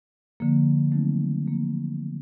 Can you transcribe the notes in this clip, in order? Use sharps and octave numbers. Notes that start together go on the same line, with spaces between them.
D3 F3 A#3
D#3 F#3 A3 C4 D#4
F3 A#3